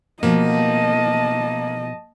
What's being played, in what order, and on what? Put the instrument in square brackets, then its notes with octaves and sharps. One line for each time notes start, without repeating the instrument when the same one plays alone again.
[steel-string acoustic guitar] B2 F3 A3 [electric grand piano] A#3 [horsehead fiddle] D#5 A5